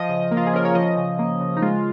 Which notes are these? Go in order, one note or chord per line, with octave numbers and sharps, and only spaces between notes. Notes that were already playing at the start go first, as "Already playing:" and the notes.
Already playing: F3 D#5
C#3
A#3
F4
G#4
C#4 A#4
C#5
F3 D#5
C#3
A#3
C#3
D#4
G#3 F4